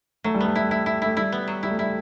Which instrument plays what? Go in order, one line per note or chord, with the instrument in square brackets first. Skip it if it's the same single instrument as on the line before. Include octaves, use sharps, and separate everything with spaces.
[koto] F#3 [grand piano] A3
[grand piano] G3
[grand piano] A3 [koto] B3
[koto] E4
E4
E4
[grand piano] A3 [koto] E4
[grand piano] G3 [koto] E4
[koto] B3
F#3
[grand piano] G3 [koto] E4
[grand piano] A3
[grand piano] G3 [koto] E4